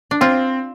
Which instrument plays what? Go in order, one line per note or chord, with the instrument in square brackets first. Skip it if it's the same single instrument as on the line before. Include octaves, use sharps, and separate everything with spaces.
[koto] D4
[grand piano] C4 [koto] F4